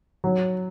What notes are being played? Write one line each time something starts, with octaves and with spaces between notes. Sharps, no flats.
F#3